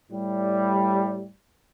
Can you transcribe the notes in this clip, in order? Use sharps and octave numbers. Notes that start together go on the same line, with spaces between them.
A2 G3